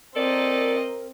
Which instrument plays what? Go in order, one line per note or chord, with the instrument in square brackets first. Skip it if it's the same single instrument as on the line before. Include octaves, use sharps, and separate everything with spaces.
[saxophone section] A#2 A4 D5 [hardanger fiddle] C4 D#5 [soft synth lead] A#4